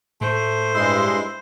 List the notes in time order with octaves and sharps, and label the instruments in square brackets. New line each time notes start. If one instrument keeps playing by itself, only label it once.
[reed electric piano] A2 [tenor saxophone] A3 [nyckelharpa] C5
[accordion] G2 G#3 C6 [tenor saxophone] E4